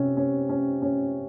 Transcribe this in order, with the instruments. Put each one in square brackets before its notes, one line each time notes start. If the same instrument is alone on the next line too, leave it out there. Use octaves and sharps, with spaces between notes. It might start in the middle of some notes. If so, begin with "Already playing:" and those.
Already playing: [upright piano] C3 C#4
C#4
C#4
C#4